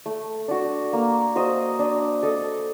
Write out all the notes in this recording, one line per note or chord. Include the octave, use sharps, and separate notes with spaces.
A3
D4 F#4
A#3
F#4 C5 D#5
D4
A4 D#5